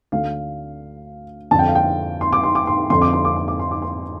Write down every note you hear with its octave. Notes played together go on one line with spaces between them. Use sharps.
D2 D3 F5
F2 D3 A5
G5
F5
G5
C6
D6
C6
D6
C6
F2 D3 C6
D6
C6
D6
C6
D6
C6
D6
C6